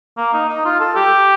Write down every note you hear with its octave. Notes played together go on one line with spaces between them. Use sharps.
A#3
D#4
D#4
F4
A4
G4